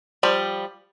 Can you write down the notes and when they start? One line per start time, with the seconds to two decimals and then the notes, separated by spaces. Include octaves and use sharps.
0.23 F3 G3